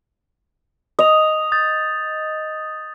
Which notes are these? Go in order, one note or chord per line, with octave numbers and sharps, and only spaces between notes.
D#5 D#6 F7
D#6 G6 A6